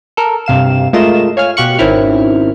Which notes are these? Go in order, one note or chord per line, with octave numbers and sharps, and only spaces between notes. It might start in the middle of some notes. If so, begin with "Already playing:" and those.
A4 A#4
G2 C3 F5 E7
G#3 A3 F4 A#4 D#5 E7
C#5 F5 G#5 F6
B2 G4 F5 C#6 F#6 C#7
G#1 D#3 C4 C#4 E4 F6